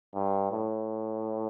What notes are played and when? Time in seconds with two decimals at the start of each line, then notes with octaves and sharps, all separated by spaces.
0.14 G2
0.52 A2